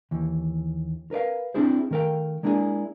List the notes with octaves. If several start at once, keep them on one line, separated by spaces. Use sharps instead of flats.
D#2 E3
A#4 B4 D5 F5
C4 D4 E4 G#4 C5
D#3 A3 A#4 F5 G5
G#3 A#3 D4 E4 F#4 G#4